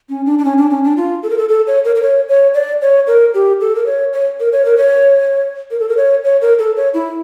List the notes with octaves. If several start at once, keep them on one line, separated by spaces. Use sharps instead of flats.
C#4
D4
D4
C#4
D4
C#4
D4
F4
A4
A#4
A4
A4
C#5
A#4
A#4
C#5
C#5
D5
C#5
A#4
G4
A4
A#4
C#5
C#5
A#4
C#5
A#4
C#5
A#4
A4
A#4
C#5
C#5
A#4
A4
C#5
E4